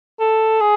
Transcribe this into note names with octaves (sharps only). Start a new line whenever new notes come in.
A4
G#4